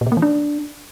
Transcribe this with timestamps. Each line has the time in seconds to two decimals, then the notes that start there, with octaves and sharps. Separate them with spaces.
0.01 A#2
0.06 B2
0.12 A#3
0.17 E3
0.22 D4